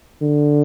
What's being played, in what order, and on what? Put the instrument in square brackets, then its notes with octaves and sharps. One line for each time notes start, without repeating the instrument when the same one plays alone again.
[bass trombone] D3